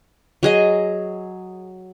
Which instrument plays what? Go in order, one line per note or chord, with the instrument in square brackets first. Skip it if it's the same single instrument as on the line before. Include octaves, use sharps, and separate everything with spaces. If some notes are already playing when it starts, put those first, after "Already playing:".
[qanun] F#3 G#4 D#5